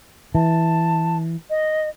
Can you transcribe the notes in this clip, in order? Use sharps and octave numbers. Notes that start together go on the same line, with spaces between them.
E3 A5
D#5